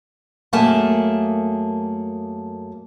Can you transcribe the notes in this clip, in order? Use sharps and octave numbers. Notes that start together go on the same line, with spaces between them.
F#2 A3 A#3 G#4 A5